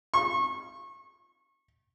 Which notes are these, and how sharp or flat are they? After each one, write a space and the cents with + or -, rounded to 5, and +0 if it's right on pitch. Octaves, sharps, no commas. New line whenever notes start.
C#6 -30